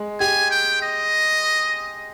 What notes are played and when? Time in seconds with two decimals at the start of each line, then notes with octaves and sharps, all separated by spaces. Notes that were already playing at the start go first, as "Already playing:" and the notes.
Already playing: G#3
0.20 G4 G#5
0.51 G5
0.82 D#5